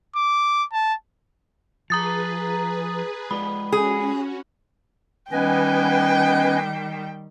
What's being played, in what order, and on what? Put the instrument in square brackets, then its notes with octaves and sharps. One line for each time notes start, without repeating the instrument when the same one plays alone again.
[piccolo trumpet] D6
A5
[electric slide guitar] F3 [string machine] G#4 B4 [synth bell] A#5 D#6 A6
[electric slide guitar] G#3 F4 D5 [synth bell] B5
[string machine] C#4 F#4 [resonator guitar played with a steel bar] G#4
[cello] D#3 G3 [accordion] B3 B4 G#5 [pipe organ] C#4 D#5 [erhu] G5